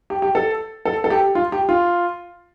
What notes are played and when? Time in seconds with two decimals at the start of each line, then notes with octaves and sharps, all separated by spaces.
0.10 G4
0.22 G4
0.35 A4
0.85 A4
1.04 A4
1.10 G4
1.35 F4
1.52 G4
1.69 F4